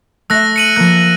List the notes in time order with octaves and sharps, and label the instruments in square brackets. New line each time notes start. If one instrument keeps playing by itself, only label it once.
[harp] A3 E5 [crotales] E6 F#6 A#6
[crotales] C#7 D#7 F#7
[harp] F3 A#3 [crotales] F#6